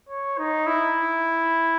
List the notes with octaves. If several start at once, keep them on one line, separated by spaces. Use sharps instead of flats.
C#5
D#4
E4